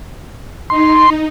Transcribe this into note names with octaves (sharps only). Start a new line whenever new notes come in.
D#4 C6